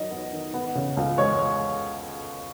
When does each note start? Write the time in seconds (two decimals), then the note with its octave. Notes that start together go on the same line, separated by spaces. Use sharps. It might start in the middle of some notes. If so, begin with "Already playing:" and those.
Already playing: D#3 F#3 D#5
0.11 B3
0.32 D#3
0.54 B3
0.75 C#3
0.97 C#2
1.18 G#3 C#5